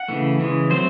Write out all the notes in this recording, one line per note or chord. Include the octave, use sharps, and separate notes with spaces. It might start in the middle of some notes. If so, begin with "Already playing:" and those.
Already playing: F#5
C#3 E3 A3
C#3 E3 G#3
F#3 A3 C4 C5